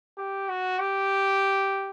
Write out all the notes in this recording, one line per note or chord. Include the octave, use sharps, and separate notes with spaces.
G4
F#4
G4